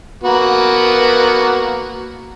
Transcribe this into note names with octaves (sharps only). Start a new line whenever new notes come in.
A#3 B3 F#4